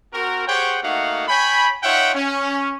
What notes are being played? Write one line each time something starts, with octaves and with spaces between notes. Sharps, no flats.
C4 F#4 A#4
G4 G#4 C5 C#5 F#5 G5
A3 A#3 D#4 F#4 F5 F#5
C#5 G5 G#5 B5
D#4 F4 C#5 E5 F#5 G5
C#4